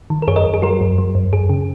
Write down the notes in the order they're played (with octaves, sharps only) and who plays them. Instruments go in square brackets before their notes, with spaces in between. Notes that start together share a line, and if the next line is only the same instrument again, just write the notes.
[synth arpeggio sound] D#3
A#4
F#2 G#4 C#5
A#4 D#5
F#2
G#4
F#3 F#4 A#4
F#2
F#3
F#2
F#2 G#4
C#3